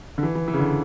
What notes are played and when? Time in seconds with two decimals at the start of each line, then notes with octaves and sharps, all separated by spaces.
0.18 D3
0.23 E3
0.35 E3
0.48 E3
0.54 C#3
0.59 D3